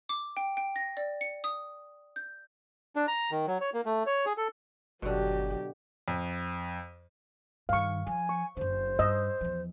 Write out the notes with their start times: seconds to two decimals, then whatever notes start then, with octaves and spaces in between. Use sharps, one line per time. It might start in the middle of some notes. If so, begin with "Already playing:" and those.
0.09 D6
0.37 G5
0.57 G5
0.76 A#6
0.97 D5
1.21 C#7
1.44 D#6
2.16 G6
2.96 D4
3.08 A#5
3.31 D#3
3.47 F#3
3.61 C#5
3.74 A#3
3.86 A3
4.06 C#5
4.26 G#4
4.37 A4
5.02 G1 B2 D3 F#3 G4
6.08 F2
7.69 G2 D#3 F5 C#6
8.07 F3 G#5
8.29 C#6
8.57 F#1 D3 C5
8.99 G2 D#5 E6
9.41 E2 F3